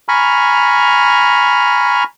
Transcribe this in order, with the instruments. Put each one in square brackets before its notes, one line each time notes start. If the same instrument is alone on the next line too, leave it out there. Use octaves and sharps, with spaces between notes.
[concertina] G#5 A#5 B5 C#6 F6